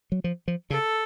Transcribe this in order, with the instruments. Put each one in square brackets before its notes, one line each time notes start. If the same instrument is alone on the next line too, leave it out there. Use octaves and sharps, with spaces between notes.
[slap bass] F#3
F3
F3
[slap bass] C#3 [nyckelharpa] A4